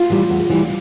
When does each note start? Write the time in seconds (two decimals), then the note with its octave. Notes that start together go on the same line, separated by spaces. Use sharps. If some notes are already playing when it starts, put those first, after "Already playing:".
Already playing: F4
0.10 E3 G3
0.30 E2
0.50 E3 G3